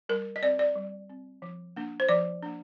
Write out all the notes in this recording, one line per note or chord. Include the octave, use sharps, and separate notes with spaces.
G3 A#4
D#5
C4 D5
D5
G3
C4
F3
A#3 D4
C5
F3 D5
A#3 D4